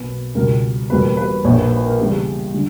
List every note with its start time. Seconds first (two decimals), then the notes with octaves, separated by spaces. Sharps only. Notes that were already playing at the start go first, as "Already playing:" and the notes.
Already playing: B1 B2 A#3 B4
0.35 C#2 B2 G3 A#4
0.90 E1 E2 B2 G3 A#3 B4
1.17 B4
1.44 A#1 A#2 A#3 C#5
1.58 B4
1.72 B4
1.86 A#4
1.99 E2 C#3 G3 G4
2.54 D3 G3